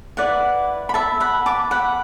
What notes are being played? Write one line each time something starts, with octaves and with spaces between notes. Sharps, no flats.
E4 B4 D5 F#5
B5
E5 A5
F#5 B5
A5 D6
F#5 B5